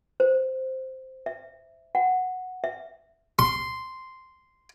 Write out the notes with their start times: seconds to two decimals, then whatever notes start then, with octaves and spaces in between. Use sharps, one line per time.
0.20 C5
1.26 E5
1.95 F#5
2.64 E5
3.39 C6